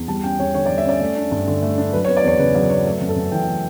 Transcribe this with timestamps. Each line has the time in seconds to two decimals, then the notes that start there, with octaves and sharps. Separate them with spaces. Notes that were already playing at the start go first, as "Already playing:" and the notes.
Already playing: E2
0.08 G3 A5
0.24 C#4 G5
0.39 E2 C#5
0.54 D3 C#5
0.66 D5
0.70 G3
0.78 E5
0.85 C#4 D5
1.01 A3
1.16 D4
1.31 G2
1.47 D3
1.62 A3
1.78 D4
1.93 F#3 B4
2.05 C#5
2.09 B3
2.17 D5
2.24 E2 C#5
2.39 C#3 B4
2.55 F#3 D5
2.70 B3 C#5
2.86 A3
3.01 F#2
3.09 A4
3.16 F#2
3.32 E3 G5
3.47 A3